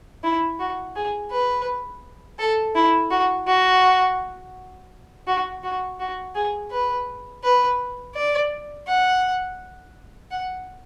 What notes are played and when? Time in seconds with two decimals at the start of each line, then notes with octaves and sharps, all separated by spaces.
0.24 E4
0.59 F#4
0.96 G#4
1.31 B4
2.39 A4
2.75 E4
3.10 F#4
3.47 F#4
5.27 F#4
5.63 F#4
6.00 F#4
6.35 G#4
6.71 B4
7.43 B4
8.15 D5
8.87 F#5
10.31 F#5